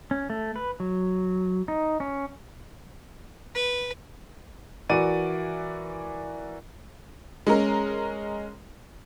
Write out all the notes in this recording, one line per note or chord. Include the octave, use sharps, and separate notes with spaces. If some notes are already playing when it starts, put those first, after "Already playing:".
C#4
A3
B4
F#3
D#4
C#4
B4
E3 F#4 A#4 D5 D#7
G#3 C#4 A#4